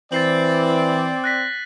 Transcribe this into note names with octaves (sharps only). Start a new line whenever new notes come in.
E3 C4 D5 A6 C7 F#7
F#6 A#6 B6